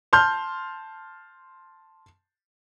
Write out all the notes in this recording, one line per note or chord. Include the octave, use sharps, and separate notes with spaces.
A5 C6 F6 G6